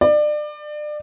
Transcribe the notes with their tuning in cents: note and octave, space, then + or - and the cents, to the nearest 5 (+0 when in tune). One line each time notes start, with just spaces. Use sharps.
D5 +30